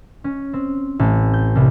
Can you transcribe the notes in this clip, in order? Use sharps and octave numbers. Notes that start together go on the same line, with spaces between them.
C#4
C4
A1
G6
C2